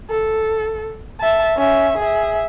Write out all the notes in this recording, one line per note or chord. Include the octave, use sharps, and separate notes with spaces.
A4
E5 A5
C#4 E5
G#4 E5